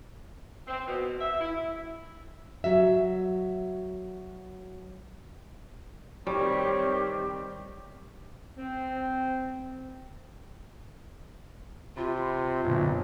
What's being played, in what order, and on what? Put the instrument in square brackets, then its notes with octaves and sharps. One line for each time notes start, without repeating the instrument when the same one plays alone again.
[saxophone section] C4
B2
E5
E4
[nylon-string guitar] F#3 F#4 E5
[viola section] D#3 C4 [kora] G3 [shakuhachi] G4 [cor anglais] C#5
[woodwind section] C4
[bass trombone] C3 [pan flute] F4 [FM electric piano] B5
[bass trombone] B1 [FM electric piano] F#2 A#2 D3